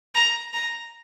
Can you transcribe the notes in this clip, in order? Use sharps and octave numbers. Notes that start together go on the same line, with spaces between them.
A#5
A#5